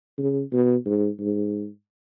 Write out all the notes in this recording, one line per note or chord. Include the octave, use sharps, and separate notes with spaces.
C#3
B2
G#2
G#2